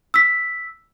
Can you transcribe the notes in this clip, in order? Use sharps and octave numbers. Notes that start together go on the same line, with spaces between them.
E6 B6